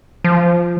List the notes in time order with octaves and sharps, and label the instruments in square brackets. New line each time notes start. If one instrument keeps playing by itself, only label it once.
[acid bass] F3